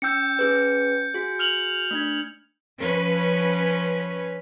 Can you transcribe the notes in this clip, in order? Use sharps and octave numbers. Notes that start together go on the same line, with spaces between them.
C#4 G5 E6 G6 C#7
C#4 G#4 B4
F#4 G#4
F6 F7 F#7
A3 D4 G#6
F3 C#4 B4 C#5